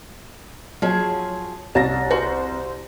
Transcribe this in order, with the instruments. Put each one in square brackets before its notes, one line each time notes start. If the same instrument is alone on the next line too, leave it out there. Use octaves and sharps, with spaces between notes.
[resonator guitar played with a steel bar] F3 G#4 [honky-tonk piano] F#3 C#5
[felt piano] C2 A6 A#6 [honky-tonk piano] C#5 [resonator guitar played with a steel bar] A5
[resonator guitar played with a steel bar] F#4 [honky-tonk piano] C5